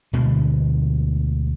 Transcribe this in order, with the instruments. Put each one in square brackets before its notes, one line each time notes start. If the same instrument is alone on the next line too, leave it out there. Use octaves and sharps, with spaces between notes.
[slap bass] D2 B2 D3 G#3